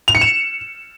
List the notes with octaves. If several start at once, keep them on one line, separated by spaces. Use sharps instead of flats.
F7
C#7
E7